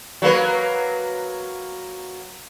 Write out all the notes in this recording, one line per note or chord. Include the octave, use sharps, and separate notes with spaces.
F#3 A#3 B4